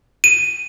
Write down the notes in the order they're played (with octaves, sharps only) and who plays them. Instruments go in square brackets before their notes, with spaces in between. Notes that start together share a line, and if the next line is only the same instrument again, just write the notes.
[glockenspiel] D#7